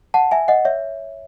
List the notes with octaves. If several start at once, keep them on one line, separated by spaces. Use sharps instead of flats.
F#5 A5
E5 G#5
D#5 F#5
C#5 E5